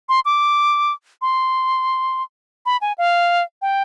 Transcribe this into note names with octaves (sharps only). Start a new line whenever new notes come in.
C6
D6
C6
B5
G#5
F5
G5